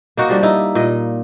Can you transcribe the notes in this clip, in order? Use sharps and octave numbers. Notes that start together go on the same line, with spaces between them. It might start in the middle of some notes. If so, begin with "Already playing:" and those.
A#3 D#4 F#4
F3 G3 D4
D#4 E4
A#2 D#5